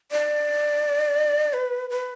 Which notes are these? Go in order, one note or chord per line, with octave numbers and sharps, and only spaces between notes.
D5
B4
B4